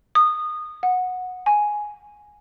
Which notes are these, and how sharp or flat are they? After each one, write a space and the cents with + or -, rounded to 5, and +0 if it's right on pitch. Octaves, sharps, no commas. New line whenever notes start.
D#6 -20
F#5 -15
G#5 +5